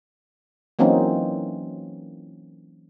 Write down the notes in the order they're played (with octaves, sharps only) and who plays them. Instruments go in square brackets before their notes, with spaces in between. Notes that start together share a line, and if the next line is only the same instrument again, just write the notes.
[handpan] E3 F#3 A#3 C4 C#4 D#4